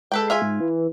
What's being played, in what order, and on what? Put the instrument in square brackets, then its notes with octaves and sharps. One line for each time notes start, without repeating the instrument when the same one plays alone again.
[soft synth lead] G#3 [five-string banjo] A4 B4 G5
[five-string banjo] F4 E5 G#5
[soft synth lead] G#2
E3